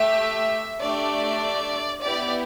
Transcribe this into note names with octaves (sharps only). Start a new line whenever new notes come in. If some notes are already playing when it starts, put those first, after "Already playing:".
Already playing: A3 G4 E5
A3 D4 G4 D5
B3 E4 G4 D5